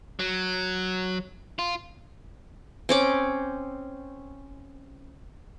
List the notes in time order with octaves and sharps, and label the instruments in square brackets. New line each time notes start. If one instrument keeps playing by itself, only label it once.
[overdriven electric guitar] F#3
F4
[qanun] C4 C#4 D6